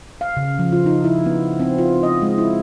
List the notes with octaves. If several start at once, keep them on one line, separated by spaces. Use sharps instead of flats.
F5
C#3
F3
F4
D#4
E4
B3
C4
F4
D#5
G#3
E4